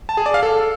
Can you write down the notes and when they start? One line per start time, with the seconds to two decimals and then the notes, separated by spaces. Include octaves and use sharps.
0.09 A5
0.17 G#4
0.26 D5
0.34 F5
0.43 A4